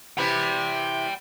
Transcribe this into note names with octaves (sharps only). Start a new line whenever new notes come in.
C3 E3 E4 G5 B5